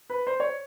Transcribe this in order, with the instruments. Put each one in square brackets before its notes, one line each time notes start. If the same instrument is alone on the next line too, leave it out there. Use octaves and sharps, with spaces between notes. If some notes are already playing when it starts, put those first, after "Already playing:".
[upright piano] B4
C5
C#5